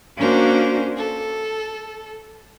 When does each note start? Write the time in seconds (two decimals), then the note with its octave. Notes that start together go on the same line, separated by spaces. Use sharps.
0.17 A#3 C#4 D4 F#4 A#4 C5
0.97 A4